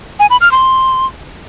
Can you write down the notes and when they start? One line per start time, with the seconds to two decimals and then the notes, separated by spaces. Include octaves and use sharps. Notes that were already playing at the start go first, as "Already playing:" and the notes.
0.20 G#5
0.30 B5
0.41 F6
0.52 C6